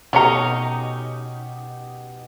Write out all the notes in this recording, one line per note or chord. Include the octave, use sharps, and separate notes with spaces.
B2 A3 C#4 D#4 G4 D5 A#5 C#7